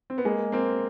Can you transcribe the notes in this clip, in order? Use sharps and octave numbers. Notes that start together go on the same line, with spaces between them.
C4
B3
G#3 A#3
A#3 C4